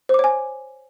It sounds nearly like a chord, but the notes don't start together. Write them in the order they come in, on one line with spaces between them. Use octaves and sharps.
C5 D6 C#5 G#5